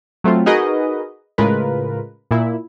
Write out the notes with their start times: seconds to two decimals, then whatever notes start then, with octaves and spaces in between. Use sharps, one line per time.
0.24 F#3 A3 C4 F4
0.46 D#4 F#4 G#4 A#4 B4 D#5
1.38 A2 C#3 G#3 F4 A#4 B4
2.31 A#2 E4